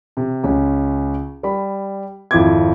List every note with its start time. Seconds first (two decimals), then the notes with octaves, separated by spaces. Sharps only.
0.17 C3
0.44 C#2 C#4
1.43 G3 B5
2.31 G#1 F2 E4 F4 D6 G#6